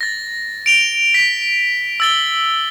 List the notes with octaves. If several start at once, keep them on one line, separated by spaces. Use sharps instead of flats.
A6 A#6
D7 F7 G7
B6
E6 A6 G7